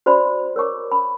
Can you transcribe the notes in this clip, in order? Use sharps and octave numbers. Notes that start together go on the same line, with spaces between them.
F#4 C5 D5 B5
A#4 C#5 C#6 D6
B5